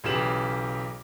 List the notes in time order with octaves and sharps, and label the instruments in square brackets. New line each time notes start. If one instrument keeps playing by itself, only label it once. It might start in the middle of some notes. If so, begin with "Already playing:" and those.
[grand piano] B1 C#3 E3 G4 E7 F#7